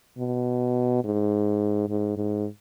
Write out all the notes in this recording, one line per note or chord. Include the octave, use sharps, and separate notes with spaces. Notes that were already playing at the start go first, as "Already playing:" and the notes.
B2
G#2
G#2
G#2